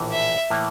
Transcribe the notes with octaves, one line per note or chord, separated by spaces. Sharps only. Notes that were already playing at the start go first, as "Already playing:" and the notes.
Already playing: A#1 A2 E3 A#3
E5
A2 E3 A#3